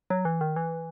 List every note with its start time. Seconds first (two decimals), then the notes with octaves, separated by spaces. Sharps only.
0.10 F#3
0.25 E3
0.41 D#3
0.56 E3